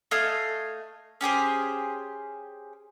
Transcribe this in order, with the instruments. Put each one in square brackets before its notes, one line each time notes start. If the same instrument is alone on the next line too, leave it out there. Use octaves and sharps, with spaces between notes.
[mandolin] A3 D#5 F5 G#5
C#4 G4 G#4 C5